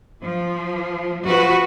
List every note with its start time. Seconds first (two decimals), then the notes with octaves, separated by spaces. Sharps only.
0.22 F3
1.25 F3 F#4 B4